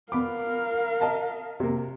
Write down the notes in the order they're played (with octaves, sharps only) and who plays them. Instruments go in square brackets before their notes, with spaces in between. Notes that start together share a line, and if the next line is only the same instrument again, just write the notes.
[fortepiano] B3 B5 D6 [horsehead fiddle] A#4 F5
[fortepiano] D#5 A5 A#5
C3 A#3